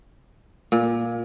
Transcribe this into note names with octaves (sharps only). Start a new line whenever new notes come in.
A#2